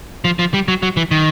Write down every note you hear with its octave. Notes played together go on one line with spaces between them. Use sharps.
F3
F3
G3
F#3
F#3
E3
D#3